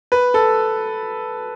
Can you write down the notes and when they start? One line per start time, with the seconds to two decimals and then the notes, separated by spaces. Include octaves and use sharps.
0.12 B4
0.34 A4